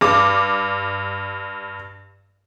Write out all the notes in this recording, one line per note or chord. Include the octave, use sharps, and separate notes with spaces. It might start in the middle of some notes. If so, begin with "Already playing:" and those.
G2 D6